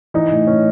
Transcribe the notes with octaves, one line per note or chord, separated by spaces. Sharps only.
E3 D#4
A2
A2 C#4